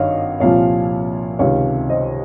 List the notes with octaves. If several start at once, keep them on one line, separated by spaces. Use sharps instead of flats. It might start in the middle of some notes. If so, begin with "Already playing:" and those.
Already playing: G#1 G2 D#3 C#5 D#5 F5
C2 A#2 F3 C#5 F5
C#2 C3 D#3 C#5 F5
C5 D#5